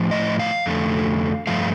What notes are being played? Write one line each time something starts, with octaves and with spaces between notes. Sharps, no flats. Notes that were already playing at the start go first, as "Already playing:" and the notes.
Already playing: A2 F3
D#5
F5
F2 D3 A3
G2 F3 A3 F5